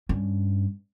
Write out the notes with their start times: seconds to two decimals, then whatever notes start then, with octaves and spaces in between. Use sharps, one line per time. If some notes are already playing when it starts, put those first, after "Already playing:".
0.09 G2 C#4